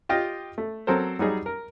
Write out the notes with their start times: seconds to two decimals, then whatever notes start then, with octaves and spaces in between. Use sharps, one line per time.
0.09 F4 G4 D#5 G5
0.58 A3
0.87 F#3 C4 A4 A#4 C5
1.19 F#3 G3 D#4 G#4
1.46 A#4